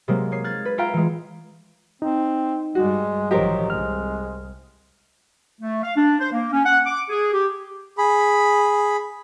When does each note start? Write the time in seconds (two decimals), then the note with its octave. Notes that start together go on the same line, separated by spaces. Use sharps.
0.08 C3 F#3 G#3 A#3
0.31 D#4 C#5 C7
0.44 F6 F#6 G#6 A6
0.65 B4
0.78 F4 E5 F5 G5 A#5 F6
0.94 E3 G#3
2.02 C4 D#4
2.75 G2 G3 G#3 F#4
3.31 A1 D#3 F3 F#3 G4 A#4 C5 D#5
3.70 C2 G#3 F6
5.60 A3
5.83 F5
5.96 D4
6.20 C5
6.32 A#3
6.52 C#4
6.66 F#5
6.87 D6
7.10 G#4
7.33 G4
7.98 G#4 B5